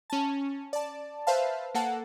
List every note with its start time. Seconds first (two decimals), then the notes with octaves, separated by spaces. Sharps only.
0.10 C#4 A5
0.73 D5 A5
1.27 B4 C5 E5 F5 A5
1.74 A#3 A4 F#5 A5